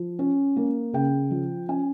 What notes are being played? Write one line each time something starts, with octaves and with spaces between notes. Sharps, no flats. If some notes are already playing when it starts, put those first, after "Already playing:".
Already playing: F3
C#4
A#3
C#3 G5
F3
C#4 G#5